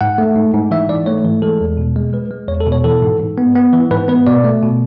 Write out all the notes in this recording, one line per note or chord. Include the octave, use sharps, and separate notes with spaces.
G#2 F#5
A3
G#2
G#2
E3 E5
G#2 D5
A3 C#5
E3
G#3 A4
E2
B2
G#3
G#3 B4
G#3
E2 C#5
A4
B2
C#5
E3 A4
G#2
G#2
B3
B3
E3
G#2 B4
B3 B4
B2 D5
A3
B2